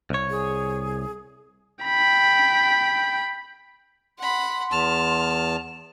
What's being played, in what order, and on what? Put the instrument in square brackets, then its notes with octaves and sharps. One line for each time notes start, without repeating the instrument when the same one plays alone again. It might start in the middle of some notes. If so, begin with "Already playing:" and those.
[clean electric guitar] C2 C#5
[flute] G#4
[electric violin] G5 B5
[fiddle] F#5 B5 [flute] C6
[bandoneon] E2 A5 [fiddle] F6